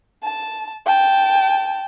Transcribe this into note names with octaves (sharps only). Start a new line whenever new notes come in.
A5
G5 A5